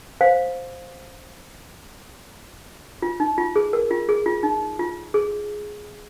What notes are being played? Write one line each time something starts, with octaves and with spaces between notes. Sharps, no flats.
C5 F5
F4
D#4
F4
G#4
A#4
F4
G#4
F4
D#4
F4
G#4